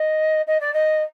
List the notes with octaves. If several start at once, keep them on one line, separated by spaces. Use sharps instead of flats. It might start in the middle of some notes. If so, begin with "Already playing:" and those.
Already playing: D#5
D#5
D5
D#5